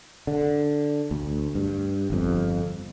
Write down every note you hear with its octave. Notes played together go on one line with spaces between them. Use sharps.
D3
D2
G2
G1 F2